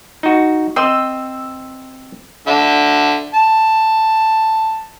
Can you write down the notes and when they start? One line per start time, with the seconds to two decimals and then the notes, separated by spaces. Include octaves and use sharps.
0.23 D#4 F#4
0.76 C4 C5 D#5 E6
2.47 D3 E5
3.34 A5